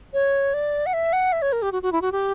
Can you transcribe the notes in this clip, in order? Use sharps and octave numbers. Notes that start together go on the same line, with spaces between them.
C#5
D5
F#5
E5
F#5
E5
C#5
A#4
G4
F#4
F#4
E4
F#4
G4